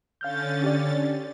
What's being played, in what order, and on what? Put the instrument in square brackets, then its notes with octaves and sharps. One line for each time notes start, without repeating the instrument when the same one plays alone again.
[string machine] D3 C#4 A6 [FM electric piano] F5 F6 G6
[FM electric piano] G4 D5